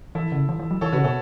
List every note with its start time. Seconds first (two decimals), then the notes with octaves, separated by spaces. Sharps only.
0.15 E3 E4 A4
0.32 C#3
0.49 E3
0.59 E3
0.71 F#3
0.81 E3 A4 C#5
0.92 C#3 F#4 B4
1.04 B2 A4 C#5